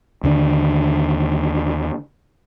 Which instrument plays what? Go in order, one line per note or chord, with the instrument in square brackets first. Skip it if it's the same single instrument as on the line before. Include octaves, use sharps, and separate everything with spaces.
[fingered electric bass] D#2 D3 D4